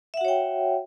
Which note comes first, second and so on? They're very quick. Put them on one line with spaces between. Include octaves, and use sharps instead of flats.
E5 F#5 F#4 C#5 G5